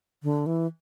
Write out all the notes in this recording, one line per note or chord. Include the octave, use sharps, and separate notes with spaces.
D3
E3